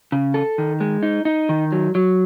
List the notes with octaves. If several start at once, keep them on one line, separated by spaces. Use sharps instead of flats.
C#3
A4
D#3
G#3
D#4
D#4
D#3
F#3
F#3